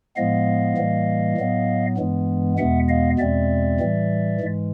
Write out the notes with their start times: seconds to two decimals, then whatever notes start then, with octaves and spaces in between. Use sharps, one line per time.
0.16 A2 F3 G#3 B3 D#5 F5
0.77 A2 E3 G3 A#3
1.37 A2 F#3 B3
1.98 G2 E3 G#3 B3
2.58 E2 B2 G#3 B3 E5 F#5
2.89 D#5 F5
3.19 E2 B2 G#3 C4 D5 E5
3.80 A2 E3 G3
4.40 G#2 E3 G#3